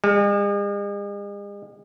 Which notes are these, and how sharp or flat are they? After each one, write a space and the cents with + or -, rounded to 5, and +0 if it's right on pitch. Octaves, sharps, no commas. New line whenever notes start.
G#3 -45